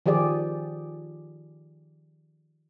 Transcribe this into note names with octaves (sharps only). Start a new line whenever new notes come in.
D#3 F3 G4 G#4 D5